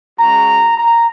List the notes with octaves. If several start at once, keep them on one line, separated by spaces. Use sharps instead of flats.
G#3 C#4 F#4 A#5
A#5